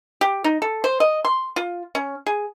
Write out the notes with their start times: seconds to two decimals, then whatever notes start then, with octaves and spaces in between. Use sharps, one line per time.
0.21 G4
0.44 D#4
0.62 A4
0.84 C5
1.00 D#5
1.25 C6
1.56 F4
1.95 C#4
2.26 G#4